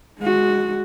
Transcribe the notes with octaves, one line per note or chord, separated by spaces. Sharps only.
G#3 F#4